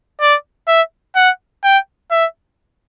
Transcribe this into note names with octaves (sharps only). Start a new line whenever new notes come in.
D5
E5
F#5
G5
E5